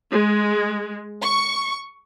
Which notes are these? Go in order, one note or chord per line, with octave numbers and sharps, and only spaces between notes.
G#3
C#6